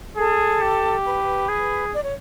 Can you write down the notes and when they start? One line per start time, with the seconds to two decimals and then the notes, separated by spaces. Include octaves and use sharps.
0.17 G#4 A4
0.61 G4
1.05 B4
1.48 G#4
1.92 D5
2.03 C#5